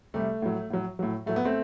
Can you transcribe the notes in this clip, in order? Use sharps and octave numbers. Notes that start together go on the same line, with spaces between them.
C3 G3 A3
A2 F#3
A2 F#3
A2 F#3
A2 F#3 A3
B3
A3 C4